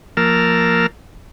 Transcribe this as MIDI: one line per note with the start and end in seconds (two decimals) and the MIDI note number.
0.17 0.87 53
0.17 0.87 58
0.17 0.87 70
0.17 0.87 81
0.17 0.87 88
0.17 0.87 89